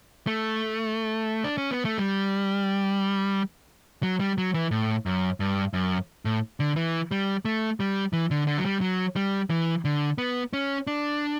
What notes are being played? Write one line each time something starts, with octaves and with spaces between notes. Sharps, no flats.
A3
D4
C#4
B3
A3
G3
F#3
G3
F#3
E3
A2
F#2
G2
F#2
A2
D3
E3
G3
A3
G3
E3
D3
D3
F#3
G3
F#3
G3
E3
D3
B3
C#4
D4